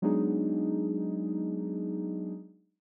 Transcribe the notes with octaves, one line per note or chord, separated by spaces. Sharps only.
F#3 G#3 B3 D4 D#4 G#4